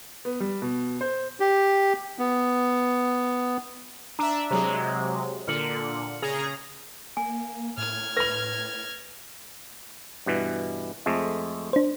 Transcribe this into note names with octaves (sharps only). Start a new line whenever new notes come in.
B3
G3
B2
C5
G4
B3
D4 E5 A#5
C3 F#3 G#3 A#5
A#2 D3 F6 C#7 F#7
C#3 G#4 A#5
A#3 G#5
A2 F6 G#6
B4 B5 A#6 F7
G2 B2 E3
F2 G#3 A3
D4 C5